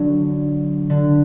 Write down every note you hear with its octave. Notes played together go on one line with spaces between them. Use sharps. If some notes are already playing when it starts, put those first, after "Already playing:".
Already playing: D3 F#3
D3